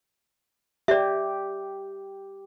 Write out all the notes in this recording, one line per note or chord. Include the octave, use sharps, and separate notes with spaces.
G4 D5 E5